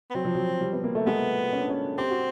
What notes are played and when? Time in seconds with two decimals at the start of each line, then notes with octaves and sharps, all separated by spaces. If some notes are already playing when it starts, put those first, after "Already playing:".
0.10 B3
0.15 F#3 C4
0.25 F3
0.35 F#3
0.61 G3
0.73 B3
0.84 A#3
0.95 A3
1.06 G#3 B3
1.53 C#4
1.61 D4
1.69 C#4
1.98 C4 G4
2.11 F#4